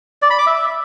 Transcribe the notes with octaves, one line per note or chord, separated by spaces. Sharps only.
D5
B5
D6
E5